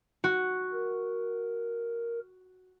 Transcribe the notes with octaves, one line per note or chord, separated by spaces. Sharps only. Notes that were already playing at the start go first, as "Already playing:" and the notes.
F#4
A#4